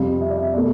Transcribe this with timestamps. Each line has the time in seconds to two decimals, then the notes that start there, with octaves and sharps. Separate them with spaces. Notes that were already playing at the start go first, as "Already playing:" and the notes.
Already playing: F2 C3 G3 F5
0.21 E5
0.30 D5
0.38 E5
0.54 B2 A3 D5